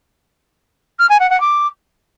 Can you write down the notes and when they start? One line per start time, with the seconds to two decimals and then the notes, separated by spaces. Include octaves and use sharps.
0.99 F6
1.09 G#5
1.20 F#5
1.30 F#5
1.40 D6